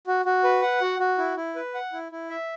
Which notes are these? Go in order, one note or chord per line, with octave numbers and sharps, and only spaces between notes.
F#4
F#4
B4
F#5
F#4
F#4
E4
E4
B4
F#5
E4
E4
E5